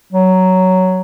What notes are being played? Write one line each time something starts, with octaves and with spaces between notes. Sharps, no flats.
F#3